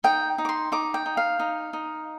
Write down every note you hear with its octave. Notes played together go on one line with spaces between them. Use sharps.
D#4 G5
D#4
D6
C6
D#4 D6
G5
D#4
F5
D#4
D#4